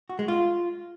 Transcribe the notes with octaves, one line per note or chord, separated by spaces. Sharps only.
F#4
G#3
F4